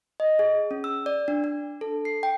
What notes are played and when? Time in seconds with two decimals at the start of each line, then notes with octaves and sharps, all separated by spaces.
0.20 D#5
0.39 G#4
0.71 C#4
0.84 E6
1.06 D5
1.28 D4
1.44 D4
1.81 A4
2.05 C7
2.23 G5